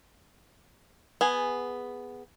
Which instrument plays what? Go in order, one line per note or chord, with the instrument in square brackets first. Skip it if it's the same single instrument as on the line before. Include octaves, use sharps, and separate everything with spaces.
[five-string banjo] B3 G#4 G#5